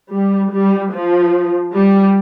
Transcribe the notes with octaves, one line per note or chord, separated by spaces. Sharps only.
G3
G3
F3
G3